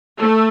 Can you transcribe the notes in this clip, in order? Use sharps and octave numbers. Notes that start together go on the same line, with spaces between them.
A3